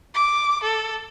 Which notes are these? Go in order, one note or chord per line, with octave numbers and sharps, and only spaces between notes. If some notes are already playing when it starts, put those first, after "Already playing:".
D6
A4